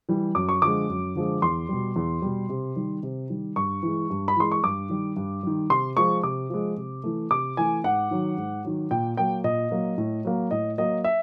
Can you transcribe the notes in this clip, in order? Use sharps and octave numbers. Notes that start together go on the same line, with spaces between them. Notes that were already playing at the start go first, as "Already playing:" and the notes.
E3 G3
F#2 D6
C#6
D3 F3 G#3 D6
F#2
D3 F3 G#3
E2 C6
B2 G3
E2
B2 G3
C3
D#3 G3
C3
D#3 G3
G2 C#6
E3 G#3
G2
B5
E3 G#3 C6
C#6
G2 D6
D#3 G3
G2
D#3 G3
C3 C6
F3 G#3 C#6
C3 D6
F3 G#3
C3
E3 A3
C3 D6
E3 A3 G#5
G#2 F#5
D#3 F#3
G#2
D#3 F#3
A#2 G5
F#3 A#3 G5
A#2 D#5
F#3 A#3
A2
F#3 A#3
A2 D#5
F#3 A#3 D#5
E5